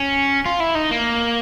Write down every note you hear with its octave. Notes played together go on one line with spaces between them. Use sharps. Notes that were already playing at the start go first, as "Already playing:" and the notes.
Already playing: C#4
F4
E4
D#4
A#3